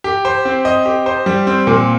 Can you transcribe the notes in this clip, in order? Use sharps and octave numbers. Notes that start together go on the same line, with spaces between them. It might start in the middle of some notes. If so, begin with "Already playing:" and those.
G4
C5
C4
D#5
G4
C5
G3
C4
A#2